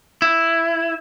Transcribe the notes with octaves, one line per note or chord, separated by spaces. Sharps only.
E4